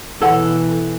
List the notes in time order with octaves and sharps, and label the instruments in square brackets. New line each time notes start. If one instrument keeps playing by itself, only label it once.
[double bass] B2 E3 [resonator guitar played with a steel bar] A4 [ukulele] C#5 F#5